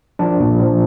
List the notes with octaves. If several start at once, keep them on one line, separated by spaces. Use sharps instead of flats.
F3 D4
A#2
F3